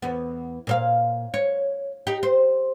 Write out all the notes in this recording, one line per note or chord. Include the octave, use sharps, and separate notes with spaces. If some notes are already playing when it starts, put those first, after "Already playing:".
E2 B3
A#2 C5 F5
C#5
D#4 G4
C5